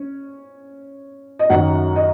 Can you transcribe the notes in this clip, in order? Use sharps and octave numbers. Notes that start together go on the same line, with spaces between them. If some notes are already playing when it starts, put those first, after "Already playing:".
Already playing: C#4
D#5
F#2 D#3 F#3 C#4 F#5
D#5